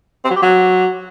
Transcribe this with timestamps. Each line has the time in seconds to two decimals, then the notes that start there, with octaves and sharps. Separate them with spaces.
0.25 C4
0.31 F#3
0.36 G4
0.42 F#3